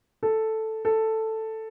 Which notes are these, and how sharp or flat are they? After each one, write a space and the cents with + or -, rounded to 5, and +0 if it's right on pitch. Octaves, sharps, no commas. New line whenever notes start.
A4 +0
A4 +5